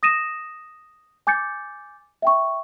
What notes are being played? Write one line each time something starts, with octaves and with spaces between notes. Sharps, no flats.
D#6 A#6 D#7 E7
G#5 D6 G6 A6 C#7
E5 G5 C#6